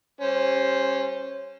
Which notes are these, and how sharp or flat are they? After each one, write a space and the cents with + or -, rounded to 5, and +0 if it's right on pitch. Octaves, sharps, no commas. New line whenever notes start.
G3 +0 C#4 -20 C5 +0